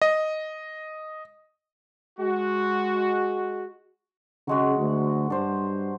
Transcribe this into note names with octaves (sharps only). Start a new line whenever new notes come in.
D#5
G#3 F#4
C#3 F#3 G#3 F#4
D2
G2 D4 C5